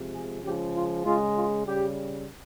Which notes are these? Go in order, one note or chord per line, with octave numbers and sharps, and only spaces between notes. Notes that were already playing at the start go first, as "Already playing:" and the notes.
Already playing: C3 F3 G#3
G#4
C#3 F3 G#3 G4
F4
C#3 G#3 F4
F4
C#3 G3 G4